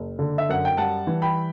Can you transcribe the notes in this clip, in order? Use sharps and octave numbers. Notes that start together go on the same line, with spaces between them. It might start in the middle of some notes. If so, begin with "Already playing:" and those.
Already playing: F#1
D3
E5
F#2 F#5
G5
G3 F#5 A5
E3
G5 B5